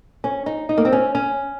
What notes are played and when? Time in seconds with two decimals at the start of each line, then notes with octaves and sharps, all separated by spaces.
0.24 C#4
0.46 D#4
0.69 D#4
0.78 A#3
0.85 C4
0.92 C#4
1.15 C#4